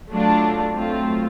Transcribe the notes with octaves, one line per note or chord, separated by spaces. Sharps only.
F#3 A3 D4 F4
F#3 A3 C4 F4